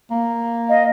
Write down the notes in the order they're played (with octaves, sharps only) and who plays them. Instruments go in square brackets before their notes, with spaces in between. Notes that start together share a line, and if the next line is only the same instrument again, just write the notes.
[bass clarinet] A#3
[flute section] D#5 F5